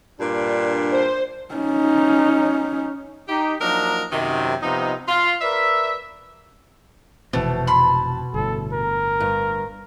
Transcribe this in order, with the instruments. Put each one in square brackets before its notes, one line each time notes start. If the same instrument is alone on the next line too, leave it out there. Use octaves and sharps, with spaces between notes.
[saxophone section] G2 A#2 D4
[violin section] C5
[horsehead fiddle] C#4 D#4
[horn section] D#4 G4
F3 F#3 A#3 D4 D#4 A#4
F#2 C3 D#3
C3 F3 B3 D#4
F4
A#4 B4 D5 E5
[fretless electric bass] F1 E3 C4 [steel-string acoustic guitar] B2 [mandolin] A3
[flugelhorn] A5 [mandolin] B5 C6
[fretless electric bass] G1 A2 [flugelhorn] A4
[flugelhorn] A#4
[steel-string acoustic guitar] G2